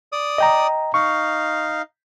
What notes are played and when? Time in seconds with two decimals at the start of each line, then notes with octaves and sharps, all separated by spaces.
0.12 D5 D#6
0.38 D#5 G5 A#5
0.94 D#4 F5 C#6